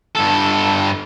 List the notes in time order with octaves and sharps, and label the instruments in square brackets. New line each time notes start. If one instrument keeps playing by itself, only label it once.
[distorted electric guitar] G2 A4